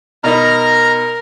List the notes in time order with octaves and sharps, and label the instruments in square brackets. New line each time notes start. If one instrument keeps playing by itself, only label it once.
[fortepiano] B2 D#4 B5 [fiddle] A#4 [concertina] A#5 F6